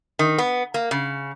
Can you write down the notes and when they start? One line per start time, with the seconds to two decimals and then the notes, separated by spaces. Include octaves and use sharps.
0.19 D#3
0.38 B3
0.74 A#3
0.91 C#3